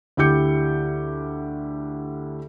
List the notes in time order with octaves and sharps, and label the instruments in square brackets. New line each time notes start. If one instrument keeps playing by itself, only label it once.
[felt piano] D2 E4 G4 D6 G6 C#7